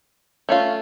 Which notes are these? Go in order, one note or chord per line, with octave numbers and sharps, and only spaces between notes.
A3 C#4 F4